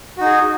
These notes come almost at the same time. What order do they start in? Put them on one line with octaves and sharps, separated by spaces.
F#4 D#4 G#4